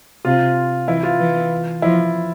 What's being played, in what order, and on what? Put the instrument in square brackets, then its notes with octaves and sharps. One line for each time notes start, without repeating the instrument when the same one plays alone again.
[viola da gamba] C3 [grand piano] F4
[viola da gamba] E3 [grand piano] E4
[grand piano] F4
[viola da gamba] E3
[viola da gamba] F3 [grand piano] E4